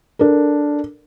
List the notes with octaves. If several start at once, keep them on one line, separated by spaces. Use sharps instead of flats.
D4 A4 A#4